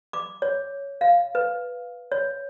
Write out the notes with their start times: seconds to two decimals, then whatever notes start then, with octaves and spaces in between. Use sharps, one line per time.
0.13 D6
0.42 C#5
1.01 F5
1.35 B4
2.12 C#5